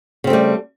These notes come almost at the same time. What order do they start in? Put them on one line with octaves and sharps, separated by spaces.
C#3 C4 A3 G3